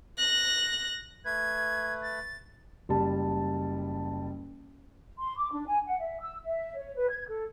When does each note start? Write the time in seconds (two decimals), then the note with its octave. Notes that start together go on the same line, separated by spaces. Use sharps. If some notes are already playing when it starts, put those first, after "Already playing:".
0.18 F#6 A#6
1.25 A3 B4 G#6
2.03 A6
2.89 F#1 G3 A5
5.19 C6
5.37 D6
5.52 D4
5.66 G#5
5.86 F#5
5.99 E5
6.20 E6
6.44 E5
6.76 C#5
6.96 B4
7.09 G#6
7.28 A4